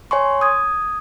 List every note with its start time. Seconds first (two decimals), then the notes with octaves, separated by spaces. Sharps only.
0.11 C#5 G#5 C6 C#6
0.41 D#6 G#6